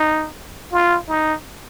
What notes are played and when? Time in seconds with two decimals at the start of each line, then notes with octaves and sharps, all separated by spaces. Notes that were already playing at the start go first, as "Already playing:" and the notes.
Already playing: D#4
0.72 F4
1.09 D#4